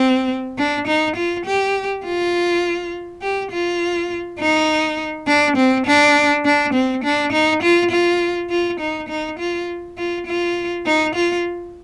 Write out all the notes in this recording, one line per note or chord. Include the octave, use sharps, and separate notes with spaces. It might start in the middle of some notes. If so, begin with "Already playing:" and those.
Already playing: C4
D4
D#4
F4
G4
F4
G4
F4
D#4
D4
C4
D4
D4
C4
D4
D#4
F4
F4
F4
D#4
D#4
F4
F4
F4
D#4
F4